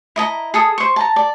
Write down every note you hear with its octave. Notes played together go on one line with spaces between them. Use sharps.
E4 D#5 A5 A#5
G#4 A4 D#6
C5 C#6
A5 A#5
D5